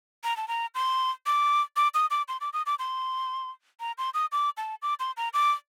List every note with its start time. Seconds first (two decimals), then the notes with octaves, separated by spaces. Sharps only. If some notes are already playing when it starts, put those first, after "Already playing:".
0.24 A#5
0.37 A5
0.48 A#5
0.75 C6
1.26 D6
1.76 D6
1.94 D#6
2.11 D6
2.28 C6
2.41 D6
2.53 D#6
2.66 D6
2.79 C6
3.80 A#5
3.98 C6
4.14 D#6
4.32 D6
4.57 A5
4.82 D6
5.00 C6
5.17 A#5
5.34 D6